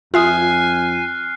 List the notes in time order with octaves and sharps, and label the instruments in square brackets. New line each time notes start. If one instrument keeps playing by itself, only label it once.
[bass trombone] F2 [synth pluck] F4 E5 D#6 [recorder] G#5 [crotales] F6 F#6 C7